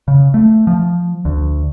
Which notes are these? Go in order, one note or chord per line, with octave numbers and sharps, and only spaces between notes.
C#3
A3
F3
D2